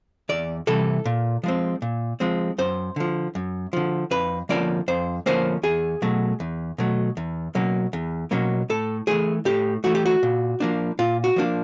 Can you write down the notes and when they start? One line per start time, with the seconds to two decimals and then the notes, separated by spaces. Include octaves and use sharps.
0.29 E2 D5
0.67 C3 E3 G3 A4
1.05 A#2
1.43 F3 G#3 C4
1.82 A#2
2.20 F3 G#3 C4
2.58 F#2 C5
2.96 D3 F3
3.35 F#2
3.73 D3 F3
4.11 F2 B4
4.49 D3 F3 A#3 C#4 D5
4.88 F2 C5
5.26 D3 F3 A#3 C#4 C5
5.63 E2 G#4
6.02 B2 F#3 A3
6.40 E2
6.78 B2 F#3 A3
7.17 E2
7.55 B2 F#3 A#3 C#4
7.93 E2
8.31 B2 F#3 A#3 C#4
8.70 A2 A4
9.07 E3 A3 G#4
9.45 A2 G4
9.84 E3 A3 F#4
9.95 G4
10.06 F#4
10.23 A#2
10.60 F3 A#3 D4
10.99 A#2 F4
11.24 F#4
11.36 F3 A#3 D4